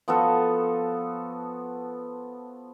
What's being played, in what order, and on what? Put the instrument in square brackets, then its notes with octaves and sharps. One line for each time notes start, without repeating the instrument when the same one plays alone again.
[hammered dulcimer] F3 B3 F#4 A4